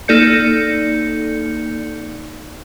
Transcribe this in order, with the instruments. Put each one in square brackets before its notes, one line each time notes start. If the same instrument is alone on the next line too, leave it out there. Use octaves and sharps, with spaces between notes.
[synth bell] A#3 D#4 A4 D5 G6 C#7